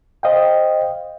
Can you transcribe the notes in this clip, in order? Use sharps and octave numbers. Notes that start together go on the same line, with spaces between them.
C5 D#5 F5 G5